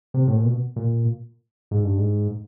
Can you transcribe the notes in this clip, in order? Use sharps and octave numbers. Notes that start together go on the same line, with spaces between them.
C3
A2
A#2
B2
A#2
G#2
G2
G#2